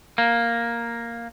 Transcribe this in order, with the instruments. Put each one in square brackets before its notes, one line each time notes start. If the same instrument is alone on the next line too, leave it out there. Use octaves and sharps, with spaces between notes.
[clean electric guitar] A#3